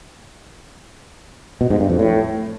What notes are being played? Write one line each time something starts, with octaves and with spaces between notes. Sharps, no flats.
B2
G#2
G2
F2
A2